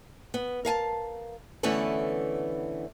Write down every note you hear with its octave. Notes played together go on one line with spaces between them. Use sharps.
B3
A#4 F5 G#5 A5
D3 E3 A3 B3 C#4 B4